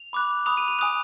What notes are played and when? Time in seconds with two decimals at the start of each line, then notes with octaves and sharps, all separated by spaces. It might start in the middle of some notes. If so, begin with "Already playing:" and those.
Already playing: F7
0.13 B5 D6 F#6
0.46 B5 D#6 F#6 F7
0.57 D#7
0.68 F7
0.79 G#5 D#6 F#6 F7